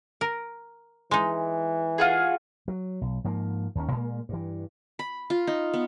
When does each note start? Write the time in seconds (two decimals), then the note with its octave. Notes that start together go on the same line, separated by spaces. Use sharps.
0.21 A#4
1.11 E3 G#3 D#4
1.98 F4 F#4 G#4
2.68 F#3
3.01 B1
3.24 G#2 F3 A#3
3.75 D#2 D#3 C#4
3.92 A#2 G#3 A#3
4.29 G2 E3
4.99 B5
5.30 F4
5.47 D#4
5.74 B3